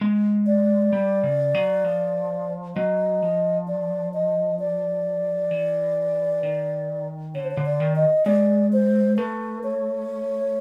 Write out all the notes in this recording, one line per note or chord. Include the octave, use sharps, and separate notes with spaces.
G#3
D5
G3
C#3
F#3
F3
F#3 D#5
F3
D5
D#5
D5
E3
D#3
D3 C#5
C5
C#5
D3
D5
D#3
D#5
G#3 D5
C5
A3 B4
C#5